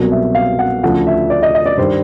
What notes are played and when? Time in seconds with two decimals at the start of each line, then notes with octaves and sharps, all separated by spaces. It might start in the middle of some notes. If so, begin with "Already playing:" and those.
Already playing: C2 B2 F#3
0.12 E5
0.35 F5
0.59 F#5
0.83 D2 C#3 F3 F#5
1.07 E5
1.30 D5
1.43 D#5
1.55 D#5
1.66 D5
1.78 G2 D#3 G3 C5